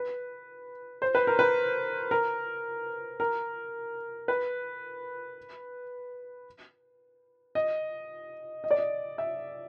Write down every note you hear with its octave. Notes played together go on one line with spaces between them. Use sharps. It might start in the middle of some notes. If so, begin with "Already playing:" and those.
Already playing: B4
C5
B4
A#4
B4
A#4
A#4
B4
D#5
D#5
D5
D#5
E5